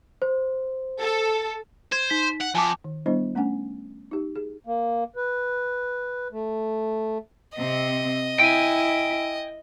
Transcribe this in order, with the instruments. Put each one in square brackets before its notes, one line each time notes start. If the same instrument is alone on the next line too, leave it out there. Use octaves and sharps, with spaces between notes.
[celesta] C5
[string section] A4
[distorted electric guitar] C5 [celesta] G#6
[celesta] D#4 B6
[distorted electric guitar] F#5
[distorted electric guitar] F2 [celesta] G#5 A5 D6
[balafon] D#3
G3 B3 D4 E4 C5 D#5
A3 C#4 D4 F#5 G#5
D#4 G4
G#4
[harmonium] A#3
B4
A3
[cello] C3 C4 [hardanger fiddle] D#5
[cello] E4 [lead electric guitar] G5 G#5